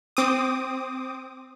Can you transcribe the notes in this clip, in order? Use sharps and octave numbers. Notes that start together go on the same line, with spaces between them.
C4 D6 D#6